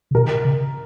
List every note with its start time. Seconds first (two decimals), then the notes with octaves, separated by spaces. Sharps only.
0.11 C#3
0.15 B2 A#4
0.45 C#3